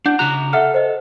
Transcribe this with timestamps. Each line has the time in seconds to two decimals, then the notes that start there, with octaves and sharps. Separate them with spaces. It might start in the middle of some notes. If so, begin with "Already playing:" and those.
0.06 D4 F#5 G6
0.19 C#3 F#4 A#5 F#6
0.53 A4 E5 F#5 F6
0.74 C5 D#5